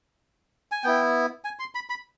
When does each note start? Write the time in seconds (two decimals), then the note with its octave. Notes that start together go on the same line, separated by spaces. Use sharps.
0.72 G#5
0.83 B3 E4 G5
1.44 G#5
1.59 C6
1.75 B5
1.90 B5